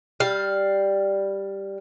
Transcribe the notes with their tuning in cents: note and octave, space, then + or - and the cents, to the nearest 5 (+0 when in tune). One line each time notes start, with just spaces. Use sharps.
G3 +0 F5 +0